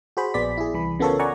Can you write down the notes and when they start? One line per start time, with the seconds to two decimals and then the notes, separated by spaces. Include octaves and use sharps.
0.17 F#4 G#4 C5 B5
0.34 A#1 B3 G#4 D5 B6
0.57 E4 G#4
0.74 C2 E3 B5
0.99 C#3 B3 F4 A4 A#4 C#5
1.19 D5 F#5 G#5 A#5 C#6